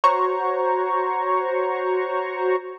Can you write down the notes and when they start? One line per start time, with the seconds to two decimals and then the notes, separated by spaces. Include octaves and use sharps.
0.04 F#4 C5 C#5 A#5 C#6